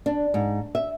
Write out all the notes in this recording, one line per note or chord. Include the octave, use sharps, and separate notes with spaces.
D4
G#2
E5